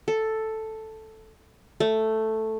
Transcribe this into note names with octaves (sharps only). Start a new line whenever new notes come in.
A4
A3